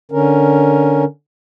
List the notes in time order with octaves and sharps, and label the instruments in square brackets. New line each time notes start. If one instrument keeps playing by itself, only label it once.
[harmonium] D3 C#4 A#4